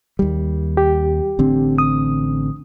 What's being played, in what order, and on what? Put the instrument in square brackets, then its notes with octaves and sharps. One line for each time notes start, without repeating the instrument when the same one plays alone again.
[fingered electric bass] D#2 G3
[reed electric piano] G4
[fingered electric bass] A1 D3 C4
[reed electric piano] D#6